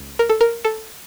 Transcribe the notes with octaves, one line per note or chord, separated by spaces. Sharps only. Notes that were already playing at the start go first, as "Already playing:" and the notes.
Already playing: C#2
A#4
A4
A#4
A4